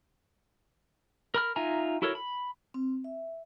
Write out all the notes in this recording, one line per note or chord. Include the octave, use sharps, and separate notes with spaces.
A#4 B5 F6
D#4 F4 E5 G#5 A#5
E4 F#4 A4 A#4 C#5
B5
C4
E5